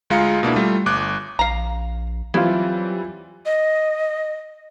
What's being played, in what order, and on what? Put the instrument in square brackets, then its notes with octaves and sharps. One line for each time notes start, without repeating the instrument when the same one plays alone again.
[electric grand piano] D2 G#3 F4 F5 A#5 C#7
B2 A#3 D4 E4
G3 A3 F4
G1 D6 F#6
[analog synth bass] A#1 [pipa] F5 A#5
[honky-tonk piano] E3 G3 C4 [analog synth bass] F#3 [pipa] E4 [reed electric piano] F4 B5
[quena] D#5